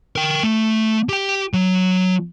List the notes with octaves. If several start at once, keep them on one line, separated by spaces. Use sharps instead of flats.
A#4 G5
A3
G4 G5
F#3